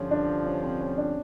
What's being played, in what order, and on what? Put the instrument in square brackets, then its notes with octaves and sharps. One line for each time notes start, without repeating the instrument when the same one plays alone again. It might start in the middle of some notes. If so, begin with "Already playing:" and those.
Already playing: [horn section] G2 D3 F3 [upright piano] C#4
[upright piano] D4
C#4
C4
C#4
D4